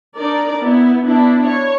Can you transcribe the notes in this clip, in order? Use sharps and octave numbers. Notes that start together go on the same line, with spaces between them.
D4 D#4 A#4 D5
B3 E4
B3 D4 E4
C#5